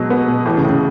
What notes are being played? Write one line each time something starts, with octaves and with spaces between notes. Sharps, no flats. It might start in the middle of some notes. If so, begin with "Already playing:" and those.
Already playing: B2 F#3 G#3
B3
B2
A2 E3
C#3
A2
C#3